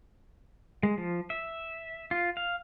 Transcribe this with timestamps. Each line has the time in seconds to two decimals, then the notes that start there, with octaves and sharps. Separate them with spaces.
0.83 G#3
0.98 F3
1.30 E5
2.11 F4
2.37 F5